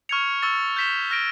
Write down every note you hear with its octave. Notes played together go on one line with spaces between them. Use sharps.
C#6 F6 G#6 C#7 F7
C#6 E6 A6
G6 B6 E7 G7
F6 A#6 D7 G7